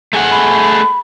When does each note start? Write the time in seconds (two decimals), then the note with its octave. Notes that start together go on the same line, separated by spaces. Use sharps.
0.13 A3 G#4 F#5
0.31 B5